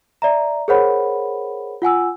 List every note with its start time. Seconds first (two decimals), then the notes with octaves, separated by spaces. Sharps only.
0.22 D5 E5 A#5
0.68 G#4 A#4 C5 C#5 F#5 B5
1.82 F4 F#5 G#5 E6